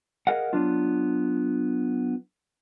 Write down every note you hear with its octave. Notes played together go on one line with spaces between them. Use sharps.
G#4 A#4 D#5 F5 F#5
F#3 B3 D4 F4